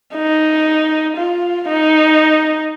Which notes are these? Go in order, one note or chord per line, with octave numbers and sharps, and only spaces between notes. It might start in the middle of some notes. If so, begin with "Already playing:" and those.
D#4
F4
D#4